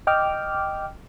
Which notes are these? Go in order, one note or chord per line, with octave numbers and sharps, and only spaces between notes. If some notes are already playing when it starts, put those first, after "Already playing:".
D#5 G5 D6 F6